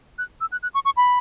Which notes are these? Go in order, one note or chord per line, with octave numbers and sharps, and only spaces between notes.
F#6
E6
F#6
F#6
C#6
C#6
B5